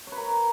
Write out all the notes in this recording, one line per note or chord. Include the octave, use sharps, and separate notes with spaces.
A#4 B4 C#5